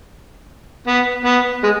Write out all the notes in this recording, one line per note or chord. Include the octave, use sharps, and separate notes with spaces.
B3
B3
G#3